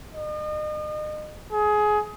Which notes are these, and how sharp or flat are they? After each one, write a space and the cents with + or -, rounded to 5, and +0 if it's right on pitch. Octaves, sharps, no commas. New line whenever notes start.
D#5 -35
G#4 +20